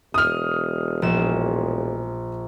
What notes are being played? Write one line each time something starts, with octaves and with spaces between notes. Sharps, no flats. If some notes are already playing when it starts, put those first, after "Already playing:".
E1 D#6 F6
A#1 E7